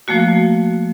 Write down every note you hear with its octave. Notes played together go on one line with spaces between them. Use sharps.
F3 A3 A#3 F#4